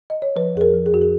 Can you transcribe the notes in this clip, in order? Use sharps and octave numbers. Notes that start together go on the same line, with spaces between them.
D#5
C#5
F3 B4
F2 G#4
A#4
F3
G#4
F2 F#4
G#4